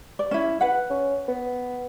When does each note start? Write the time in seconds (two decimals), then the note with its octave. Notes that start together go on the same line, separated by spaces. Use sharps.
0.19 D5
0.31 C#4 E4
0.61 B4 F#5
0.90 C#4
1.28 B3